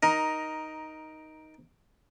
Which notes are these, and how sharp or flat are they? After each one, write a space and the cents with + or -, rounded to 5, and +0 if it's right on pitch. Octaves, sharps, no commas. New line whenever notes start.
D#4 +5 A#4 +15